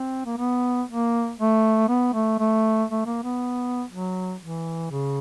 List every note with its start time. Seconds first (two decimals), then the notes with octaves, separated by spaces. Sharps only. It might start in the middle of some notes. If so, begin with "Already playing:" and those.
Already playing: C4
0.26 A#3
0.37 B3
0.88 A#3
1.38 A3
1.88 B3
2.13 A3
2.39 A3
2.90 A3
3.06 A#3
3.23 B3
3.90 F#3
4.41 E3
4.91 C#3